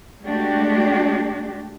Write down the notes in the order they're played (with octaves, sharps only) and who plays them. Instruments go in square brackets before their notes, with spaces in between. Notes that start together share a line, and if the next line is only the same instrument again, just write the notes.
[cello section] G#3 A3 D4 F#4 G4